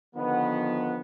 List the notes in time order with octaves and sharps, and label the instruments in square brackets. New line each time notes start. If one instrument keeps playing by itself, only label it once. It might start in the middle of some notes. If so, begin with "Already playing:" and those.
[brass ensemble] D3 D#3 F3 B3